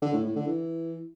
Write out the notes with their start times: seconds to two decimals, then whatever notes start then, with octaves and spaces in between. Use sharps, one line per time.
0.02 D3
0.13 A2
0.25 A2
0.36 D3
0.47 E3